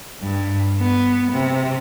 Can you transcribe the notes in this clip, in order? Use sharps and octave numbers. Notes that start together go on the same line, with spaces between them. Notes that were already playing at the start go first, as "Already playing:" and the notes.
G2
B3
C3